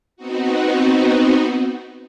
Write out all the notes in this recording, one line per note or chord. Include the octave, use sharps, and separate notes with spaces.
B3 C4 D#4 F#4